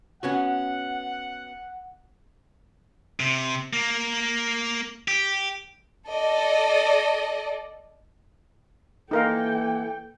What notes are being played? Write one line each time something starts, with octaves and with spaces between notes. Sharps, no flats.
B3 C#4 F#4 F#5
C3
A#3
G4
A4 D5 D#5
E3 A#3 D#4 A4 A#4 F5 G5